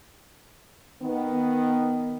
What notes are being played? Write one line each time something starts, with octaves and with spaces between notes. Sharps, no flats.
D#3 B3